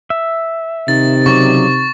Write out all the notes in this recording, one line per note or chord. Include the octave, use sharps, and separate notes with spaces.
E5
C3 D#3 A6
C#3 F#3 D5 C#6